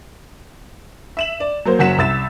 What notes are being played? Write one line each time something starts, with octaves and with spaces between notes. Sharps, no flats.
E5 E7 F#7
D5
F#3 A#3 C5
F#1 F#3 F#5 B6 E7
C2 E6 A6 E7